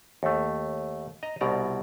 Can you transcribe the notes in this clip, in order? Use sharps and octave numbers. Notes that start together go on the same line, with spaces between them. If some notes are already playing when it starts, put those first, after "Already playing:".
D#2 A3
D#5 A#5
C2 B2 D5 A#5